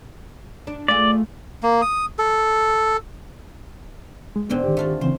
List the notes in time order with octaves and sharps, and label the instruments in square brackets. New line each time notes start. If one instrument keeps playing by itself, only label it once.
[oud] D4
[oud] A3 F4 G#4 [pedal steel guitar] D5
[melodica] A#3
D#6
A4
[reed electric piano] G#3
[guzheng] G#2 D3 C4 [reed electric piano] B3
[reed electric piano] D#3 G4
[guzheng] A3 F4 F#4
[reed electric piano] C#3 E3 C4 [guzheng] C5